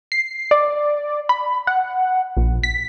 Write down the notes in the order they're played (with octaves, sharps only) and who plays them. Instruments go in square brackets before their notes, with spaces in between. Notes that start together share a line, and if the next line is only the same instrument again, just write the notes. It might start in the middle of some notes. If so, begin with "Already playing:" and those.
[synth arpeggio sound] C7
D5
B5
F#5
A#1
B6